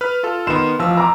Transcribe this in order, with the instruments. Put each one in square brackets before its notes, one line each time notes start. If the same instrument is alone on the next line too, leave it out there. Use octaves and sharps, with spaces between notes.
[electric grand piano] B4 F6
F4 A4
[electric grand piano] D#3 B3 [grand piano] C6 E7
[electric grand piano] A1 E6 [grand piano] F3
[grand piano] A#5 D6